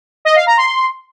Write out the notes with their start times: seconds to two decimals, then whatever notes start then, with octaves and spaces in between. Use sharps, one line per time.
0.25 D#5
0.36 F5
0.47 A#5
0.57 C6